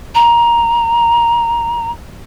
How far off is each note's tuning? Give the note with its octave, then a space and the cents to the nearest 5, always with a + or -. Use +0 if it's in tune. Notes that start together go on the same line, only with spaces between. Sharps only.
A#5 +10